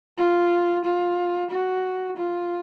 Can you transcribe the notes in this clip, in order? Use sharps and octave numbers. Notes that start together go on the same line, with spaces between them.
F4
F4
F#4
F4